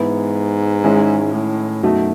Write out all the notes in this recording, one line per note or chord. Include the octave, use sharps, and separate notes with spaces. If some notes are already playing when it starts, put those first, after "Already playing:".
Already playing: G#2 E3 B3 E4
D#3 G#3 C#4 E4
A2
F#2 B2 A3 D#4 F#4